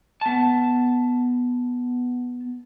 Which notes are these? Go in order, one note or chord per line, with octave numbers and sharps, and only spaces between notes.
B3 A5